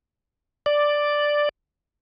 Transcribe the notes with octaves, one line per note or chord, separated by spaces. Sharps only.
D5